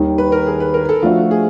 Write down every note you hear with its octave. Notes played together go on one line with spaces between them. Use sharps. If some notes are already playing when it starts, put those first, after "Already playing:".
Already playing: D#2 D#3 G3
B4
A#4
G#4
B4
A#4
A4
F3 A3 D4 F4 F#4
G#4